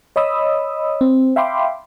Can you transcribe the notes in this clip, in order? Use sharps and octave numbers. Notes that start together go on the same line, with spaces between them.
C#5 D#5 B5 D#6 E6
C4
E5 F5 G5 B5 C6 D6